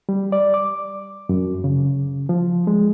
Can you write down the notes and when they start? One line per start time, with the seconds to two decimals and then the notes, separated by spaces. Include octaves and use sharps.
0.09 G3
0.32 D5
0.54 D6
1.29 F#2
1.64 C#3
2.29 F3
2.67 G#3